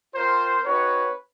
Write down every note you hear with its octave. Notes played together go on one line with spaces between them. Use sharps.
C4 F4 A#4 C5
C4 D#4 F#4 B4 C#5